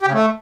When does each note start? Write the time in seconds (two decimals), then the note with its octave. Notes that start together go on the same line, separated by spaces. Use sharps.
0.01 G4
0.07 C#3
0.13 A3